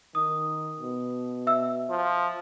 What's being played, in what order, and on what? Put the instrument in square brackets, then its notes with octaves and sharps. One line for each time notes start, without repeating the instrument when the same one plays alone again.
[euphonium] D#3 [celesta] D#6
[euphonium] B2
[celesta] E5 E6
[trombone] F3